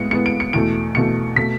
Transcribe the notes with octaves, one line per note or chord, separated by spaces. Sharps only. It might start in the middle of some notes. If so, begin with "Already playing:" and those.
Already playing: A2 G#3 B3 C#7
A2 G#3 B3 C#7
D7
C#7
E2 B2 A3 D7
E2 B2 A3 C#7
B2 A3 B6